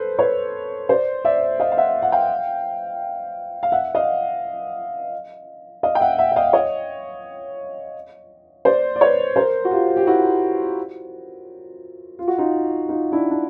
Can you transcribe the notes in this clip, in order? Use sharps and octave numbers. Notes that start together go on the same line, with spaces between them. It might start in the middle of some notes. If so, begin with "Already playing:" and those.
Already playing: A4 B4 C5
B4 C#5
C5 D5
D5 E5
D#5 F5
F5
E5 F#5
F#5
F5 G5
F5
E5 F#5
D#5 F5
D#5 F5
G5
E5 F#5
E5 F#5
E5
D#5 F5
C#5 D#5
C5 D5
D5
B4 C#5
A#4 C5
F#4
F4 G4
G4
E4 F#4
F4
F#4
D#4 F4
D#4 F4
D4 E4
D4